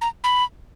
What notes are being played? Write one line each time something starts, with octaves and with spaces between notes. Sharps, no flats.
A#5
B5